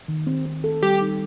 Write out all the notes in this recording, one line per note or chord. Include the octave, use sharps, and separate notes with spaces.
D#3
C4
C4
A4
G3 G4
D#4